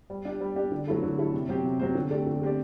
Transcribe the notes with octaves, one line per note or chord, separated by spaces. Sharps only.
G3
D4 G4
G3
D4 G4
D3
F#3 A3 E4 A4
D3
F#3 A3 E4 A4
C3
F#3 C4 G4 C5
C3
F#3 C4 G4 C5
D3
A3 C4 G4 D5
D3
A3 C4 G4 D5